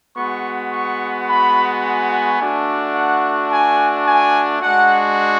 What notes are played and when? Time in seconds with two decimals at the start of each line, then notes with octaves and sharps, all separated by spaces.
0.16 G#3 B3 F#4 C#6
0.72 C#6
1.28 B5
1.83 G#5
2.39 A3 D4 F#4
2.95 F#5
3.51 G#5
4.07 G#5
4.62 G#3 D4 F#4 F#5